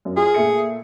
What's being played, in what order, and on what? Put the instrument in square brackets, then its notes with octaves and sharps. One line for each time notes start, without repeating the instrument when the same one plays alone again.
[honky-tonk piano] F#2
[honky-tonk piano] F4 [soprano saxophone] G#4
[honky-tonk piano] A#2 A3 C#7